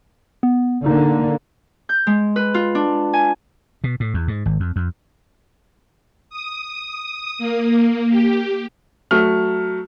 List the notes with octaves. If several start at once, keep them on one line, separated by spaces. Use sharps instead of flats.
B3
D3 A#3 D#4
G6
G#3
B4
F4
D4
G#5
B2
A2
E2
G#2
G#1
F2
F2
D#6
A#3
G4
F#3 A3 F6